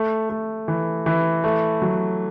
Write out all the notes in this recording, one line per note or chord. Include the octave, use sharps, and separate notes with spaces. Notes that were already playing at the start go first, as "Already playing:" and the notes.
Already playing: A3
A3
E3
E3
A3
F#3